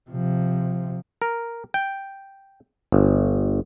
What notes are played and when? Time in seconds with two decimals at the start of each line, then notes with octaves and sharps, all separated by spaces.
0.10 C3 F3
1.22 A#4
1.74 G5
2.92 G1